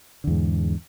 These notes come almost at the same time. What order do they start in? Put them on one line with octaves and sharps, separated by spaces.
D3 E2 G#2